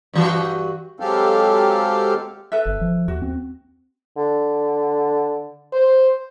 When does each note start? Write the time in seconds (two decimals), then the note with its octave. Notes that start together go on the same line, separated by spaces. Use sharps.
0.13 G2 E3 F#4
1.00 F#3 G#3 C4 G4 A4 F5
2.52 A4 B4 E5
2.66 G1
2.81 F3
3.08 D#2 F#4
3.22 C4
4.17 D3
5.73 C5